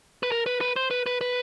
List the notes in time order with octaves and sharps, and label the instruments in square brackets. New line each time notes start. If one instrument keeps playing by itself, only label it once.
[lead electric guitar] B4
A#4
B4
B4
C5
B4
B4
B4